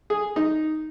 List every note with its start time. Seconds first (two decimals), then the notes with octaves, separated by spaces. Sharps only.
0.10 G#4
0.36 D#4